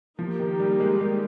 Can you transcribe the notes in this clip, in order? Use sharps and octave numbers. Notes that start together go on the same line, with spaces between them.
F3 A#3 D#4 G4
D#3
G3
G#3
G#3